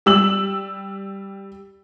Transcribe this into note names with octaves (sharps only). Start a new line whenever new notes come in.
G3 E6 F#7